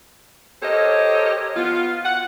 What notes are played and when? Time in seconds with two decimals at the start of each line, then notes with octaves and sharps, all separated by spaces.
0.63 G4 A4 A#4 C5 C#5 D#5
1.56 B3 F4
2.04 F#5